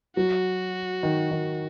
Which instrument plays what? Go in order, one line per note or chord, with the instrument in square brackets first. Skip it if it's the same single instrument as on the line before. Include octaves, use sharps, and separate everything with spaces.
[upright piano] F#3 [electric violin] F#4
[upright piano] D#3
D#3